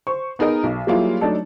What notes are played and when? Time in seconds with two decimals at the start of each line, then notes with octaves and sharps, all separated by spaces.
0.07 C5 C#6
0.39 B3 D#4 G#4 A#4 D#5
0.63 B1
0.87 F#3 G3 A#3 E4 F4 G#4
1.21 F#3 A3 D4 D#4 A4